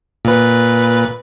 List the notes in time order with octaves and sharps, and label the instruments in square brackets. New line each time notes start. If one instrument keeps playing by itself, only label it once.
[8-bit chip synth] A#2 B4